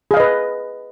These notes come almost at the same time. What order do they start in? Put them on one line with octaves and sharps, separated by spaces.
G#4 F5 D#5 B4